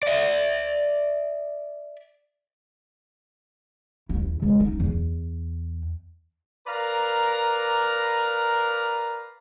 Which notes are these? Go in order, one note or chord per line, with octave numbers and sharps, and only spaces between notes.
D5 E5
D#2 E4
C#3 G#3
D#4
E2
A#4 B4 D5 F5 A#5